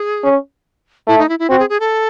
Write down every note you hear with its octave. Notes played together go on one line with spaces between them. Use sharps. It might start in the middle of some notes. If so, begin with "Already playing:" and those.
Already playing: G#4
C#4
A3 E4
D#4
E4
E4
C4 F#4
G#4
G#4
A4